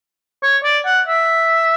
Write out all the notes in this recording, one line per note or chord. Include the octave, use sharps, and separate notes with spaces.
C#5
D5
F#5
E5